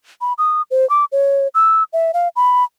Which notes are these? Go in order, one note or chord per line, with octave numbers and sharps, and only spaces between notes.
B5
D#6
C5
D6
C#5
E6
E5
F5
B5